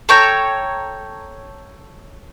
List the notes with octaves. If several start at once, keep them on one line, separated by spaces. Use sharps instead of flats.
A4 C#5 G5 A#5